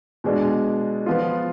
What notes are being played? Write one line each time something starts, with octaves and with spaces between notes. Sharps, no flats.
B2 G#3 D4
F3 B3 F4